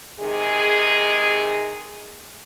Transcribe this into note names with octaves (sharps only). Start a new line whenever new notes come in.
C3 D#3 G#3 G#4